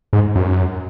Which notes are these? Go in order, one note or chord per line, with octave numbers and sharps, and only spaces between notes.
G#2
F#2